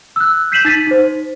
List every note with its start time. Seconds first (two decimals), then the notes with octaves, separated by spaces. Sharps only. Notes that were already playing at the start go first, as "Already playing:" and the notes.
0.16 E6 F#6
0.52 G6 B6 C7 D#7 E7 F#7
0.65 D#4 A6 B6 D#7
0.87 D#4 C5